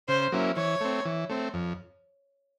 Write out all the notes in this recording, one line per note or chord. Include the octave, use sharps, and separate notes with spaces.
C#3 C5
F#3 A#3 C#4 E4
E3 C#5
A3 C4
E3
A3 C4
F2